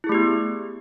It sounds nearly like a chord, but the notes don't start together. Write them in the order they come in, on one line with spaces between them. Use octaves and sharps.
E4 G#4 A3 G4 B3